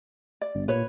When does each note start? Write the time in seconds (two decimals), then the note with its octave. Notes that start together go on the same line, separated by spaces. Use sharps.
0.41 D5
0.55 G1
0.68 A#2 B4 C#5